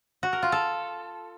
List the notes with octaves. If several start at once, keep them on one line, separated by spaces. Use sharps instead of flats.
F#4
A#4
F4
A4